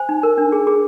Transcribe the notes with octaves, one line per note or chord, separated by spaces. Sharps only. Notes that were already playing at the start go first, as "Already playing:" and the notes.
Already playing: C5 G#5
D#4
A#4
D4
G#4
G#4